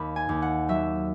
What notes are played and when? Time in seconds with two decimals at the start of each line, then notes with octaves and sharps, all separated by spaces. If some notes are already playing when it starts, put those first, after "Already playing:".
Already playing: D#2 B5
0.16 G#5
0.29 D#2
0.42 F#5
0.69 F#3 E5